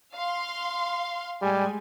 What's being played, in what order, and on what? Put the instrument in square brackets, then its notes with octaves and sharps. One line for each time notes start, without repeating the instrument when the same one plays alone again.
[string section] F5 C6
[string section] A2 G#3 G#5 [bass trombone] G3